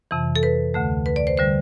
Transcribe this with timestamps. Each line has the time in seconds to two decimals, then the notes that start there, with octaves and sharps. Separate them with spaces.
0.11 F2 C3 E3
0.36 A4
0.43 B4
0.74 D2 D3 A3
1.06 B4
1.16 D5
1.27 C5
1.37 D3 G3 C5